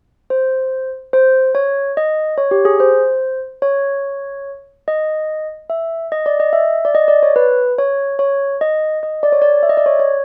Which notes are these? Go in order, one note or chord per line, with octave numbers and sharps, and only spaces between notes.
C5
C5
C#5
D#5
C#5
G4
G#4
C5
C#5
D#5
E5
D#5
D5
D#5
E5
D5
D#5
D5
C#5
B4
C#5
C#5
D#5
D#5
D5
C#5
D5
E5
D#5
D5
C#5
C#5